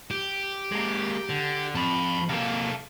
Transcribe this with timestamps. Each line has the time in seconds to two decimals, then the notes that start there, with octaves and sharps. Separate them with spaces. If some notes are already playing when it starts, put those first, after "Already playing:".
0.11 G4
0.72 G#3 A#3
1.29 D3
1.75 F2 A5 B5
2.29 C3 A#3 A4 F5